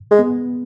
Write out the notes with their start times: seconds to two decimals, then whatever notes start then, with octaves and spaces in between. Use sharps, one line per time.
0.11 G#3
0.19 B3